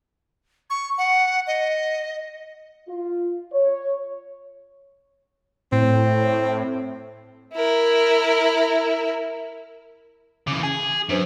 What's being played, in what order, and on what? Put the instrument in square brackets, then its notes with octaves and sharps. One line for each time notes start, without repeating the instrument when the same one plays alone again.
[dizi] C#6
F#5
D#5
[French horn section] F4
C#5
[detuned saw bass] A2 [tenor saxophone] C4
[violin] E4 A#4
[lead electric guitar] C#3 E3 [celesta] D6
[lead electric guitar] G#4 [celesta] G#5
[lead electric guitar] F#2 [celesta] D4 B4 C5